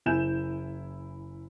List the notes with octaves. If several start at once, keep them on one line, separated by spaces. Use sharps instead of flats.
F#1 E4 G#5 G6 E7